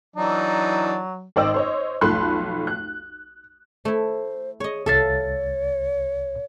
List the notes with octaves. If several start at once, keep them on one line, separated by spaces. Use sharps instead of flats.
E3 F#3 D4 D#4
G#1 C5 D5 D#5 G5 E6
C5 C#5 D#5
B1 F2 A3 B5 C6 F#6
F#6
A3 E4 C5
G#4 C#5 D#5
C2 A4 C#5 E5 F5 A6